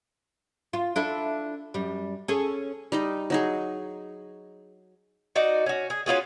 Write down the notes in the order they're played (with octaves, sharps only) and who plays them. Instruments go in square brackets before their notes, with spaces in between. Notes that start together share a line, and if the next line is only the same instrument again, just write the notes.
[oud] F4
D4 E4 A4
F#2 G3
C#4 G#4 A4
[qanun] G3 D#4 D#5
F#3 D#4 G#4
[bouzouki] D#4 F#4 D5
C#4 F#4
G#4
C#4 F4 F#4 G#4